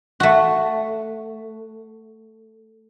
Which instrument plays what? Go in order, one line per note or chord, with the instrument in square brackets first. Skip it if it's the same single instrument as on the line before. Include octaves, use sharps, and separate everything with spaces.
[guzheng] A3 F#4